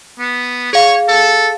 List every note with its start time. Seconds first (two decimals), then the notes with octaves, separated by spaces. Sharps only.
0.19 B3
0.73 G#4 C#5 F5
1.08 A4